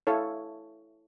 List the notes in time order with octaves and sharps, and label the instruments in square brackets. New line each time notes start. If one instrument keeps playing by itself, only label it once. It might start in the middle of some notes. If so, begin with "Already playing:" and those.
[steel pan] E4 A4 C#5 F5